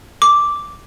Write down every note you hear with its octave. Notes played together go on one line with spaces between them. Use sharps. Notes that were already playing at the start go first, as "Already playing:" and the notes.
D6